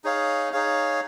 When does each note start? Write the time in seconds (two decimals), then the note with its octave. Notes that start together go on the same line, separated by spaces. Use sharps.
0.04 D#4 G#4 C#5 F5
0.52 D#4 G#4 C#5 F5